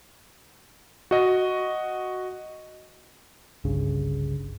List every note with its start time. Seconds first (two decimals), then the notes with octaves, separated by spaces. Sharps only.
1.11 F#4 D#5
3.64 G1 C2 G2 C#3